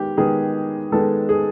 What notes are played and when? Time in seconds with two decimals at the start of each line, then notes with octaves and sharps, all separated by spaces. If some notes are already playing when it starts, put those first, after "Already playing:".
Already playing: D#3 G#3 B3 G4
0.17 D#3 G#3 B3 G#4
0.92 D#3 G#3 B3 A4
1.29 G#4